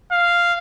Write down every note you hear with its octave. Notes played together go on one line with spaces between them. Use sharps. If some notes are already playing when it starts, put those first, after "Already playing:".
F5